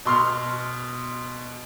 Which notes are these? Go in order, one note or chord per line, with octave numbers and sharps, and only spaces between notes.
B2 C6 F6